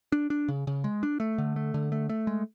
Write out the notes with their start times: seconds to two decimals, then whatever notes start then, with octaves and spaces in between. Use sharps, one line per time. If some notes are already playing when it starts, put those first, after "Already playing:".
0.12 D4
0.30 D4
0.48 C#3
0.67 C#3
0.84 G#3
1.03 D4
1.20 A3
1.38 D3
1.56 A3
1.74 D3
1.92 A3
2.09 A3
2.27 G#3